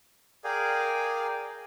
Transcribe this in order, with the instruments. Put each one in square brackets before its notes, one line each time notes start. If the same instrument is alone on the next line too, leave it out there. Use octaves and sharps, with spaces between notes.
[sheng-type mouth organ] G#4 A#4 D5 F5 G5 G#5